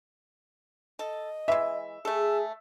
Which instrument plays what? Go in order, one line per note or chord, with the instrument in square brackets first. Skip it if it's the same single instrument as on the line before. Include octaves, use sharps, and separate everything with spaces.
[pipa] A4 [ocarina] D#5
[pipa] E3 G#3 [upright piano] E5
[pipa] A3 A4 [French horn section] G#4 [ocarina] E6